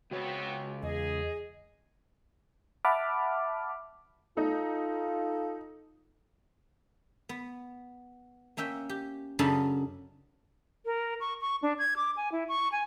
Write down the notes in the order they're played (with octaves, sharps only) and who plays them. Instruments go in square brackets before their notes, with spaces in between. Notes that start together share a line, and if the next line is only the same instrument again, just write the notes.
[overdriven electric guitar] C#2 C#5 [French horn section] B3 C4 [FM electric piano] F#4
[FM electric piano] E2 [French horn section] G#4 [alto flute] D#5
[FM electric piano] E5 F#5 A5 B5 D6 F6
[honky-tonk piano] D#4 [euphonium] F4 [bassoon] A4
[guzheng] B3
A#3 C#4 E5 G5
G4
F#2 C#3 D4 A4 D#5 B5
[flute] A#4
C#6
C#6
D4
G#6
D6
G#5
E4
C#6
G#5